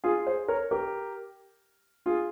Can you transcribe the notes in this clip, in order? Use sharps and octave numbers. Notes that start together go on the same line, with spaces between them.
F4 G#4
G#4 C5
A#4 C#5
G4 A#4
F4 G#4